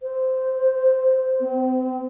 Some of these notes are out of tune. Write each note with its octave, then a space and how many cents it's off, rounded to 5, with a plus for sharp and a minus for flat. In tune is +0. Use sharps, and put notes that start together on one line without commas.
C5 -10
C4 -35